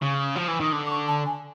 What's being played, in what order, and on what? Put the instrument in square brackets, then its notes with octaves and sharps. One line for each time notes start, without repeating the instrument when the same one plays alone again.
[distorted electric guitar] C#3 [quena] C#6
[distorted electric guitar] F3
E3
[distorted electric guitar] D#3 [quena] D#6
[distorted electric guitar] D3 [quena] D6
[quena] D6
C#6
A5
G#5